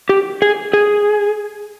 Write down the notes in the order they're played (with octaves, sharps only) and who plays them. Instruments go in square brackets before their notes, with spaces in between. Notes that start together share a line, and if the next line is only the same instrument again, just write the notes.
[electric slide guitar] G4
G#4
G#4